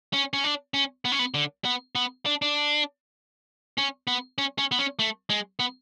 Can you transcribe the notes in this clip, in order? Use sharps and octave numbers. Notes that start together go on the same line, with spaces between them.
C#4
C#4
D4
C#4
B3
C#4
B3
D3
B3
B3
D4
D4
C#4
B3
C#4
C#4
B3
C#4
A3
G#3
B3